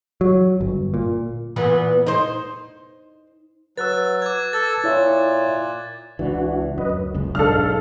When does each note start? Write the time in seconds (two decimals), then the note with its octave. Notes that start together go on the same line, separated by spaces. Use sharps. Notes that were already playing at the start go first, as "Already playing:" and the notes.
0.21 F#3
0.61 G1
0.94 A#2
1.56 A#2 E3 B3
2.06 D#4 C5
3.78 F#3 B4 E6 F#6 A6
4.22 D6 G#6
4.53 A4 A6
4.84 A#2 E4 C#5 E5
6.19 C#2 E3 D4 F#4
6.78 F#2 B4 D#5
6.90 D2
7.14 F#1 C#2
7.35 B1 G#2 D4 A4 F5 F6